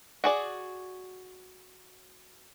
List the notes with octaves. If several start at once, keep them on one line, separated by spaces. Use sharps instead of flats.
F#4 G#4 D5